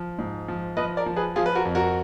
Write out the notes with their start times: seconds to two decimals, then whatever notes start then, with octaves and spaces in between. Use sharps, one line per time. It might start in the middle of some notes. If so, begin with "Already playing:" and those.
Already playing: F3
0.18 G#2
0.48 F3
0.77 F3 B4 D#5
0.97 A#4 D5
1.06 F3
1.16 G#4 B4
1.36 F3 F4 G#4
1.46 B4
1.55 F#4 A#4
1.65 F2
1.75 F#4 A#4